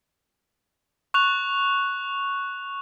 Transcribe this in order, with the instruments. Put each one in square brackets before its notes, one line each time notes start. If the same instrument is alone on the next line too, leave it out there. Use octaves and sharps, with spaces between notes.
[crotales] C#6 F#6 F7